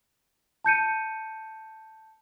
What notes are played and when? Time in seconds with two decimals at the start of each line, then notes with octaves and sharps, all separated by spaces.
0.65 A5 G6 C#7 D#7